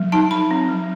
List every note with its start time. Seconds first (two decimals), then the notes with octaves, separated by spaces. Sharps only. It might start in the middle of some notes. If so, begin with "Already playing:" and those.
Already playing: F#3
0.12 D#4 A5
0.31 F#3 B5
0.51 C4
0.69 F#3